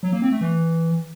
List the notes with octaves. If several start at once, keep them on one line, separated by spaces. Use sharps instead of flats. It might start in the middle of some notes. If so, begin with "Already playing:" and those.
F#3
A#3
C4
A3
E3